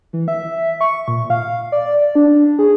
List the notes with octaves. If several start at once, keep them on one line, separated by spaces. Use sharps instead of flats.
E3
E5
C#6
A#2
F5
D5
D4
G#4